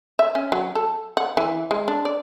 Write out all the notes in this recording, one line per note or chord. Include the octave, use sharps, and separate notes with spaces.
E5
C#4
F#3
A4
F#5
E3
G#3
D4
D5